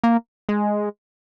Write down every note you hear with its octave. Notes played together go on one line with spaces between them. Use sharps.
A#3
G#3